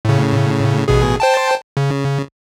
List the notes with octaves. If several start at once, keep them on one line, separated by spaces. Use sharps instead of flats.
A2 C#3
A1 B2 G#4
C5 G5 A5
C#3